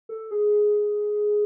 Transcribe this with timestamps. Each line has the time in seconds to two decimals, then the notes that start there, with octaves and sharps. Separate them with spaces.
0.09 A4
0.31 G#4